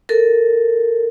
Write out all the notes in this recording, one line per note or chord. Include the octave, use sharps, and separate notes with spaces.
A4 A#4